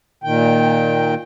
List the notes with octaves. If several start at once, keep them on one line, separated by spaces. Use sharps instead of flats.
A#2 D#3 G5